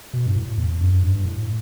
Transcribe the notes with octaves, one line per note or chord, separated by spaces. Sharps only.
B2
G2
A2
E2
F#2
G2
A2